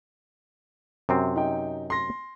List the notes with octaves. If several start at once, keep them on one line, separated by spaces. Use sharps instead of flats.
F#2 C3 C4
D#4 G5
C6 A#6